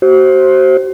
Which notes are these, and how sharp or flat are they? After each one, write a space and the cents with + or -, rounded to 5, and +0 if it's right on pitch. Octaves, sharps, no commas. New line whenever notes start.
F#4 +40 C5 +15